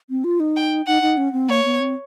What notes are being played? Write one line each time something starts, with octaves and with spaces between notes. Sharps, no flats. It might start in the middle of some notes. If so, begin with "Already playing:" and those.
C4
F4
D#4
G5
D#4 F#5
D#4
C#4
C4
A#3 C#5
B3
C4